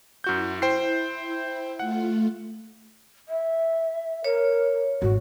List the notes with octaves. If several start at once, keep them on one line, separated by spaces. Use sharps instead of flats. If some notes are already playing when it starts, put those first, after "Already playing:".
F#2 E4 F#4 G6
C5 G5 C7
A3 F4 F#5
E5
A#4 C#5
G#1 F#4